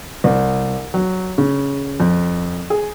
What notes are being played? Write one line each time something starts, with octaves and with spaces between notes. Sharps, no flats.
C2
F#3
C#3
F2
G#4